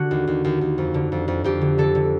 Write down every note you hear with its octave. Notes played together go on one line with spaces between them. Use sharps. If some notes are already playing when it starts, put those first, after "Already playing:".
Already playing: D3 F#4
D#2
D#2
D#2
D#2
F2
D3
F2
F2
F2 G4
D3
D3 A4
D3